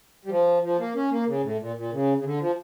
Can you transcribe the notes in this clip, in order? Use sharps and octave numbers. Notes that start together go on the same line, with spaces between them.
G3
F3
F3
A#3
C#4
A#3
C#3
A2
A#2
A#2
C#3
C#3
D3
F3